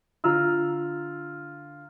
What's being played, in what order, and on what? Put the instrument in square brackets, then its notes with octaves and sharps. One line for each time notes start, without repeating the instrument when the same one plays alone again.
[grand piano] D3 F4 A#5 E6 F6